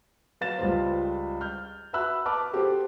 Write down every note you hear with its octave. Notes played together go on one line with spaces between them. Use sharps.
F#3 B4 F5 A6 E7
C#2 G3 F4 B4 C5
F6 G6
F#4 B4 E5 B5 E6 F#6
B4 A5 D6 F6
F#4 G4 A4 C5